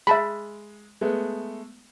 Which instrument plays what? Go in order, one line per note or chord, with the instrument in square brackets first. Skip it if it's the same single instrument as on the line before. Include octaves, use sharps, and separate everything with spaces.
[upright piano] G#3 [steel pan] E5 A5 B5
[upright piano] G#3 A3 B3